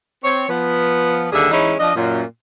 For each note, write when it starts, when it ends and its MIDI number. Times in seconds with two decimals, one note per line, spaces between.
0.24 0.47 60
0.24 0.47 73
0.49 1.27 53
0.49 1.27 59
1.32 1.50 39
1.32 1.50 50
1.32 1.50 55
1.32 1.50 68
1.32 1.50 76
1.51 1.74 52
1.51 1.74 56
1.51 1.74 61
1.51 1.74 63
1.51 1.74 64
1.80 1.95 53
1.80 1.95 62
1.80 1.95 75
1.96 2.23 42
1.96 2.23 46